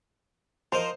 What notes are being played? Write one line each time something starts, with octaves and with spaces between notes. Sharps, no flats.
F3 A#4 C5 D#5